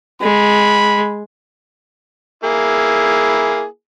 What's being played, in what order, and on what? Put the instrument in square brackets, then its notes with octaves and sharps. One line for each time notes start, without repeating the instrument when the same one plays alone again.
[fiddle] G#3 [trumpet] B5
[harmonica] A#3 E4 G#4